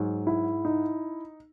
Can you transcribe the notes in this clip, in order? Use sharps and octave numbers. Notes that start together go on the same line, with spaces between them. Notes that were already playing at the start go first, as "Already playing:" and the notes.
Already playing: G#2 F#3
E4
D#4